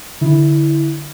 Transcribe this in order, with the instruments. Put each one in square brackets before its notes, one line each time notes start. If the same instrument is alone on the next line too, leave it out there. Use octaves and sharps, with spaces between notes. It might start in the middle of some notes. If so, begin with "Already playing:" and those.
[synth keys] D3 E4